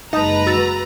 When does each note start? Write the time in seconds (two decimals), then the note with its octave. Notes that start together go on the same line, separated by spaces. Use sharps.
0.13 F#1 G#3 D#4 B4 A5 A#5
0.46 F#4 E6 A6